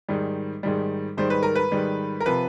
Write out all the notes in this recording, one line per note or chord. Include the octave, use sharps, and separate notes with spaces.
G#2 D#3 G3
G#2 D#3 G3
G#2 D#3 G3 C5
B4
A#4
B4
G#2 D#3 G3
A#4
C3 F3 B4